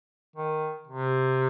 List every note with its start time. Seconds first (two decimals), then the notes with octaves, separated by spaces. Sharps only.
0.36 D#3
0.88 C3